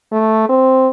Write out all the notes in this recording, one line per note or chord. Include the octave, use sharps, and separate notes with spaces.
A3
C4